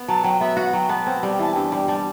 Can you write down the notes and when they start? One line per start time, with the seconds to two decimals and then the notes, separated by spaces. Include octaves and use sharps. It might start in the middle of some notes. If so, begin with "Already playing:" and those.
Already playing: B3
0.08 F#3 A5
0.24 F#3 G5
0.40 B3 E5
0.57 F#4 F#5
0.73 F#3 G5
0.89 B3 A5
1.07 C4 G5
1.18 G3 A5
1.30 G5
1.39 E3 A5
1.53 G2 G5
1.65 A5
1.72 G3 G5
1.88 G3 A5